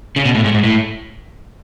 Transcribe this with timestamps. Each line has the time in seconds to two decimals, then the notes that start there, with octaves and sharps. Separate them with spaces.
0.16 C#3
0.25 B2
0.35 A2
0.44 G#2
0.54 G#2
0.64 A2